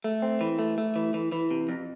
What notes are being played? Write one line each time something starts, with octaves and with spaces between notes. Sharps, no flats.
A3
C4
E3
A3
A3
E3
E3
E3
C3
F2